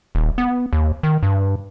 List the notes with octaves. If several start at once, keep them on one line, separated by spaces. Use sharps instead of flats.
D#1
B3
D#2
D#3
G2